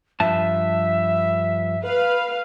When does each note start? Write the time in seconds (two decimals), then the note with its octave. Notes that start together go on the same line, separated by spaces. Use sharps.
0.20 G2 F3 E5 A5
1.83 B4 F5